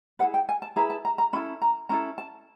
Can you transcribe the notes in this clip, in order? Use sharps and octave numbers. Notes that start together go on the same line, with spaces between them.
E4 G#4 B4 F#5
G5
G#5
A5
E4 G#4 B4 A#5
A5
A#5
A#5
C#4 E4 A4 B5
A#5
C#4 E4 A4 A#5
A5